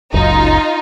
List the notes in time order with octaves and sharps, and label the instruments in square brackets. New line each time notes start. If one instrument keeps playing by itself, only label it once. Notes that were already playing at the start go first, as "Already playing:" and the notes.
[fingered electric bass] F#1 C#2 F#2 [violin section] D#4 F4